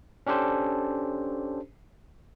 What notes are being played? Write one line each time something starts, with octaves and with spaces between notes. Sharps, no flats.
C#4 D4 G4 A4 C5